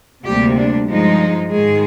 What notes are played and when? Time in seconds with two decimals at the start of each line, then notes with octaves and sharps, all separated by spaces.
0.24 D2 C3 G3 A#3 G4
0.56 D4
0.87 G2 F3 G#3 D#4
1.50 G#2 D#3 G#3 G#4